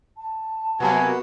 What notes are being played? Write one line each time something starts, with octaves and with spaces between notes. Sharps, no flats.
A5
C3 F#3 A#3 B3 F#4 G#5